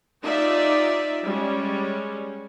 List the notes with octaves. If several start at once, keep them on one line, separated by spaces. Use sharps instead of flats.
D#4 F4 G4 D5 E5
G3 G#3 C#4